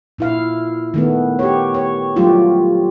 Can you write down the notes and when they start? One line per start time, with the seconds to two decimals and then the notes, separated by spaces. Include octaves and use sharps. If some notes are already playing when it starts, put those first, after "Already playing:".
0.18 A#2 E4 F5
0.94 D#3 A3 B3
1.39 G4 C#5
1.74 C#5
2.16 F#3 G3 A3 F4 G4